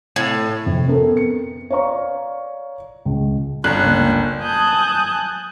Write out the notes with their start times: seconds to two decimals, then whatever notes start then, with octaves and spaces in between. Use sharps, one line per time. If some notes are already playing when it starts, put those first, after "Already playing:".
0.16 A2
0.66 F2 C3
0.88 B3 C4 A4 A#4
1.17 C#7
1.70 C#5 D5 F5 A#5 C#6
3.05 C#2
3.64 G1 C#4 F4 G5 F#6
3.84 C#2 A#3
4.42 G#5 A5 D#6 F#6 G6